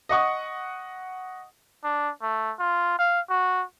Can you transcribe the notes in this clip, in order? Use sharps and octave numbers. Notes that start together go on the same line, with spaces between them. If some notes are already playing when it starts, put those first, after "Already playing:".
D#5 F#5 C#6 D#6
D4
A3
F4
F5
F#4